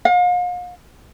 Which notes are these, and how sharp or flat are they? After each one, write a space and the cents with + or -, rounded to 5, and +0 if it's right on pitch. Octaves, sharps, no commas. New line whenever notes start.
F5 +40